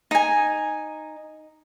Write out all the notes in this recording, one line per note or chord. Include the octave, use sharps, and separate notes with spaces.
D#4 G#5